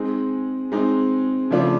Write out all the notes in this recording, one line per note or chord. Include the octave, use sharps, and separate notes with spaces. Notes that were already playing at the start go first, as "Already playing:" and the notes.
Already playing: G#3 C4 D#4
G#3 C4 D#4
C#3 F3 A3 D4 F4